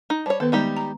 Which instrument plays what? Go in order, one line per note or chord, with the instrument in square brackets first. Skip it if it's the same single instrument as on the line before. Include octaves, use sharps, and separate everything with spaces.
[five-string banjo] D#4
[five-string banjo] G3 C#5 [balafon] C5 A5
[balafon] D#3 B3 B4 [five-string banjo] A4
[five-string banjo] G3 D#4 G4 [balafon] G#3
[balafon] A#5